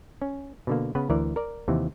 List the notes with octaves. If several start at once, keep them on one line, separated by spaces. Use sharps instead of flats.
C#4
B2 D3 A#3
C#3 B3 B4
D2 E3 A#4 D5
A#4 D5
D#2 C3 E3